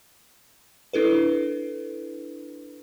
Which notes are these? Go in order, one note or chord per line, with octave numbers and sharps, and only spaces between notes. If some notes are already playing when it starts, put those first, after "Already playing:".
D4 E4 A4 B4